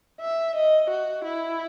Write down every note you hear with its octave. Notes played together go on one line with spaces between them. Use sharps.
E5
D#5
F#4
E4